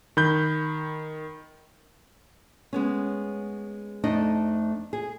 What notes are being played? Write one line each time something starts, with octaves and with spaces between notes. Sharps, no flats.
D#3 B5 G6
G#3 B3 C#4
F2 A3 D4 D#4 D#5
G#4